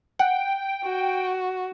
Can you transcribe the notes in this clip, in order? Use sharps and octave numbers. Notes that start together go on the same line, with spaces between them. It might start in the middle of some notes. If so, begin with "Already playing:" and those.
F#5 G5
F#4